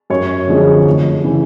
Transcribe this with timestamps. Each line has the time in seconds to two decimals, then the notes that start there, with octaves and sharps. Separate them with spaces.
0.10 F#2 C#5
0.48 D3 F3 G#3 C4
0.87 F1
1.24 C#3 E3